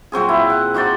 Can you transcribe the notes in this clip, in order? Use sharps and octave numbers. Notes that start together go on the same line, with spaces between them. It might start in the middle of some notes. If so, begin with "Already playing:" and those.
A#2 F#3 C4 G#4
E4
F#5
D#4 F#4 C5 D5